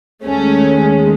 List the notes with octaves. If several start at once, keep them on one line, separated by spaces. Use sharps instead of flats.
D#2 D#3 G#3 A3 C#4